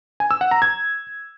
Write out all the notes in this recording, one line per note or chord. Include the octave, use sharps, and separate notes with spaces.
G#5
E6
F#5
A#5
G#6